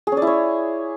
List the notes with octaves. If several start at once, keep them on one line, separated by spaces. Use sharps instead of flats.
G#4
C#4
D5
E4
C#5